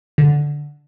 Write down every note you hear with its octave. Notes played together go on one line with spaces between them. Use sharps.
D3